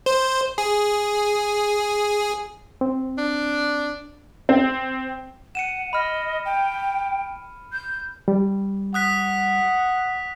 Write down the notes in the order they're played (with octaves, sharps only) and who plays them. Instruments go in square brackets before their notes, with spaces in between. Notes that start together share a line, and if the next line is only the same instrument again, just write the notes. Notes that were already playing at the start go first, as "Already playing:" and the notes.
[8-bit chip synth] C5
G#4
[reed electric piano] C4
[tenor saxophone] D4
[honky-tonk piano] C4
[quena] F#5 [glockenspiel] C#7 D#7 E7
[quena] D#5 [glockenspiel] B5 F6
[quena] G5
G6
[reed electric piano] G3
[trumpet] F#5 [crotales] D#6 F#6 B6